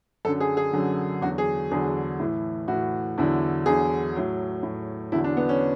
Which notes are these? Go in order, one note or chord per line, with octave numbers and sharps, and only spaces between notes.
F#2 D3 F#3 A4
G#4
G#4
F#2 D3 F#3
E2 D3 F#3 F#4
G#4
E2 D3 F#3 G#4
A2 E3
A2 F#4
E3
E2 D3 F#3 E4
E2 D3 F#3 G#4
A2 F#3
A2 F#3
E2 D3 F#3 E4
D4
B3
C#4